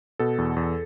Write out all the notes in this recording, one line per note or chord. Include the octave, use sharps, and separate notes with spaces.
B2 A4
E2
E2